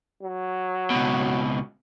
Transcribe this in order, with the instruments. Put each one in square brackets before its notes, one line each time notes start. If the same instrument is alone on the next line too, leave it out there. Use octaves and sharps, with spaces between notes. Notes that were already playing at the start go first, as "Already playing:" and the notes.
[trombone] F#3
[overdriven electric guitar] C#2 B2